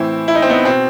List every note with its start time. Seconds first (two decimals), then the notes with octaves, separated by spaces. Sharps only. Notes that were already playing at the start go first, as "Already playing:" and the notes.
Already playing: A2 E3 C4 E4
0.28 E4
0.35 D#4
0.42 C4
0.49 B3 D#4
0.65 B2 C4